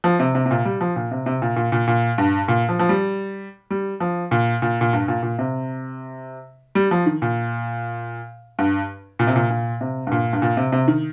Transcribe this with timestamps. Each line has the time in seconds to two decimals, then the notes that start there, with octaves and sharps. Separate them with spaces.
0.04 F3
0.20 C3
0.35 C3
0.46 C3
0.51 A#2
0.65 G3
0.81 F3
0.96 A#2
1.11 C3
1.26 C3
1.42 A#2
1.56 A#2
1.72 A#2
1.87 A#2
2.18 G2
2.48 A#2
2.69 F3
2.79 F3
2.89 G3
3.70 G3
4.00 F3
4.31 A#2
4.62 A#2
4.81 A#2
4.93 G2
5.08 A#2
5.23 A#2
5.39 C3
6.75 G3
6.91 F3
7.06 D#3
7.22 A#2
8.59 G2
9.19 A#2
9.27 C3
9.36 A#2
9.50 A#2
9.81 C3
10.07 G2
10.12 A#2
10.33 G2
10.42 A#2
10.57 C3
10.72 C3
10.88 D#3